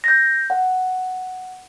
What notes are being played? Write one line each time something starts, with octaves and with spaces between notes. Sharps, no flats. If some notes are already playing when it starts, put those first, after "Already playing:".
G6 A#6
F#5